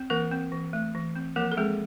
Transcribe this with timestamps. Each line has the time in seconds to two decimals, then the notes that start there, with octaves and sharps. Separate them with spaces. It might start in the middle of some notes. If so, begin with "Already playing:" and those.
Already playing: C4
0.10 E3 A#3 A#4
0.31 C4
0.52 E3
0.73 A3
0.95 E3
1.16 C4
1.36 F3 A#3 A#4
1.52 A4
1.57 G#3 C4 G#4